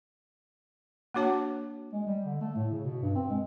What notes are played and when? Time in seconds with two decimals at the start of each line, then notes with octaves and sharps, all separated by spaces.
1.14 A#3 D4 F#4 C#5 A5
1.93 G#3
2.07 G3
2.25 D3
2.41 A3
2.56 A2
2.71 C#3
2.84 B2
3.02 G2
3.16 C4
3.30 G#3